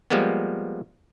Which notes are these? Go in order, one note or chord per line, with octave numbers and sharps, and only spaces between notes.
F3 G3 G#3 A#3 B3